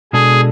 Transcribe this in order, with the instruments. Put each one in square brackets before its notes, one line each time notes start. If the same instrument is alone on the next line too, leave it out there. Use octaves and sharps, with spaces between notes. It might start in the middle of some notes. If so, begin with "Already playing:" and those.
[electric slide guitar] B2 G#3 D4 A4 [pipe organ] G#4